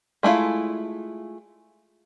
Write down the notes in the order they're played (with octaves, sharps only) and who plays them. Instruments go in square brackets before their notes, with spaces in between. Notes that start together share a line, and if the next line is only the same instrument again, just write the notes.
[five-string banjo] G#3 A3 B3 E4 F4